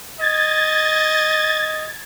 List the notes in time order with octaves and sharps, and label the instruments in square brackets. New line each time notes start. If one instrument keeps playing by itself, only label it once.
[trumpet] D#5 [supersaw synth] G#6 A6